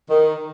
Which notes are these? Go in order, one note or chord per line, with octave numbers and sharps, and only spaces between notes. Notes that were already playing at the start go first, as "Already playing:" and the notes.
D#3